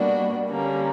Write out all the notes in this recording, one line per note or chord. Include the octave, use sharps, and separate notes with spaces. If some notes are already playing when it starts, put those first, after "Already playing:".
Already playing: B2 G3 A#3 D4 F#4
D3 G3 A#3 C#4